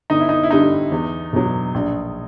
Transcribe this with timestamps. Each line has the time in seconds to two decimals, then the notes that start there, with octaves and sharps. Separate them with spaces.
0.10 G1 D#4
0.20 E4
0.29 D#4
0.43 E4
0.51 G2 D3 G3 D#4
0.92 E2
1.33 B2 F#3
1.74 A#1